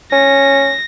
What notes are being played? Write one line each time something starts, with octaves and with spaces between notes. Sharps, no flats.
C#4 A#6